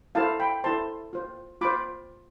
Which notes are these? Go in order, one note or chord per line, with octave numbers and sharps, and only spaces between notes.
E4 A4 C5 F5 A5
G5 B5
E4 A4 C5 A5 C6
F4 C5
F4 C5 B5 D6